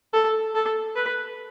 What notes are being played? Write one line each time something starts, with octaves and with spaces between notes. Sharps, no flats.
A4
A4
B4